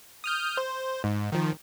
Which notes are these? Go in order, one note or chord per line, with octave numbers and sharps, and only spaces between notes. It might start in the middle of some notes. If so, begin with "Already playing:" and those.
D#6 F6 G6
C5
G#2
D#3 F3